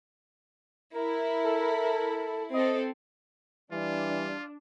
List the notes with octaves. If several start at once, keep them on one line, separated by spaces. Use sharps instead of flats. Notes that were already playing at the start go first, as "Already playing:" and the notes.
E4 A#4
A4
C4 A4 D#5
E3 G3 D4 F4